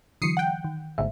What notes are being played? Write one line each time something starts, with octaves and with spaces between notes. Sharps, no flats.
D3 E3 F#3 D#6 C7 C#7
F#5 G5
D#3
G1 D2 G#2 E5